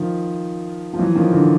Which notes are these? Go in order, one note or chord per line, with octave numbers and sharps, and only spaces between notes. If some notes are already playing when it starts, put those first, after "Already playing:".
Already playing: D#3 F3
F3
E3 F#3
D#3 F3
D3 E3